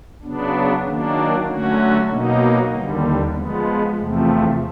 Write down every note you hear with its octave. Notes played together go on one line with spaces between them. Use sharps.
C#3 F#3 B3 D4
D#3 F#3 A#3 D4
D3 F#3 A3 C#4 F#4
B2 F#3 A#3 D#4
D#2 D3 G3
F3 G#3 B3
E2 C3 F3 A3